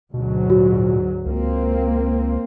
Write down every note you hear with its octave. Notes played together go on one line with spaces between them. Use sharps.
D2 G#2 B2 F#3
A#2 F#4
C#2 A#3 C4